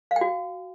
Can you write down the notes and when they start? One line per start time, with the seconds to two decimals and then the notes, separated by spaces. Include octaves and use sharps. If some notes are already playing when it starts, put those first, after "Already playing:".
0.11 F5
0.16 G5
0.21 F#4